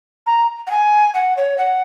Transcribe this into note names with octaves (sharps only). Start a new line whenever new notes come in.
A#5
F#5
G#5
F#5
C#5
F#5